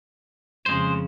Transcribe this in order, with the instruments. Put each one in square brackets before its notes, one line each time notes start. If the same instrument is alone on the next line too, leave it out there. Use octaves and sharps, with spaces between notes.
[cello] F2 C#3 [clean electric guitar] G#3 C5